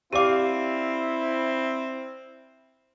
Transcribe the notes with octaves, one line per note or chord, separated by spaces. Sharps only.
C4 E4 G4 D5 F5 D6